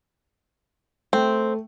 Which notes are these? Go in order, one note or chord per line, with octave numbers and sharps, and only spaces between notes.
A3 C4